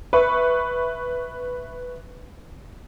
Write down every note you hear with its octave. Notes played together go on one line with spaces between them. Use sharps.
B4 E5 C#6